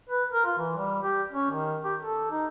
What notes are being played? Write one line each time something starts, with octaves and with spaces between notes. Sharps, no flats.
B4
A#4
F4
E3
G3
G4
C#4
D#3
G4
A4
D#4